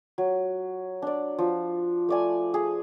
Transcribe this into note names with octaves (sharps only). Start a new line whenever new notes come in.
F#3
D4 D5
F3
A3 D5 G#5
G#4